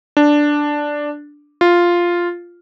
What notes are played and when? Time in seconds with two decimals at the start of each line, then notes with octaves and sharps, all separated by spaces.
0.17 D4
1.61 F4